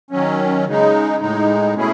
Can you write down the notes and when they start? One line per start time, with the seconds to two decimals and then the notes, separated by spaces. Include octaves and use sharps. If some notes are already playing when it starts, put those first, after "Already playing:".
0.11 D#3 F#3 C#4
0.66 C#3 G#3 D#4
1.20 A2 G#3 D#4
1.74 B2 A3 C#4 E4 G#4